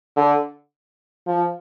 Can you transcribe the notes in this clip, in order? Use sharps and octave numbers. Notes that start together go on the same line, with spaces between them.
D3
F3